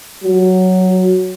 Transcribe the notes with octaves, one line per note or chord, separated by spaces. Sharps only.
F#3